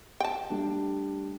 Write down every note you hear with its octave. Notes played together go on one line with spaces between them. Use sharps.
G5 A5
G3 A3 D4